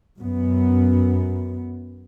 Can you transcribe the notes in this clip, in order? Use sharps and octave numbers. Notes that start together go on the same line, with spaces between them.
F#2 B3